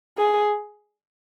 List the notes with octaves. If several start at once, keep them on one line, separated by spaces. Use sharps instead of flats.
G#4